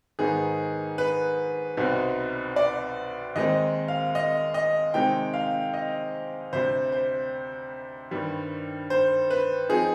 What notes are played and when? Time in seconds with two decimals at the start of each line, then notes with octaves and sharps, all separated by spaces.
0.19 G#2 D#3 B3 D#4 G#4
0.98 B4
1.77 C2 B2 G3 C4 D#4
2.56 D5
3.36 D#2 D#3 G#3 C4 D#4 D#5
3.88 F5
4.15 D#5
4.54 D#5
4.94 C3 D#3 G#3 C4 D#4 G5
5.34 F5
5.74 D#5
6.53 D2 C3 G3 C5
6.92 C5
8.11 G2 D#3 G3
8.90 C5
9.30 B4
9.69 F3 C4 D#4 G#4